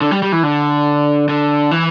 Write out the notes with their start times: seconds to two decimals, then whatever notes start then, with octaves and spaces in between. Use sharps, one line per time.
0.01 D3
0.11 G3
0.23 G3
0.32 E3
0.43 D3
1.29 D3
1.71 E3